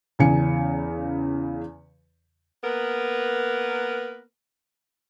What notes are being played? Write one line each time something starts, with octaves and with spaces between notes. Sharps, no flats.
E2 C#3 G#5 C#7
A#3 B3 A#4 B4